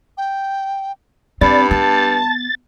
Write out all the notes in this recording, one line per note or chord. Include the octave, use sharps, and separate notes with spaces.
G5
G2 C4 D5 B5 A6
B3 A5 A6